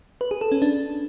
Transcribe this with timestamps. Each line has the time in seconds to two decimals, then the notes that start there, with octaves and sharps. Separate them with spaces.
0.21 B4
0.31 G#4
0.41 A4
0.52 C#4
0.62 D4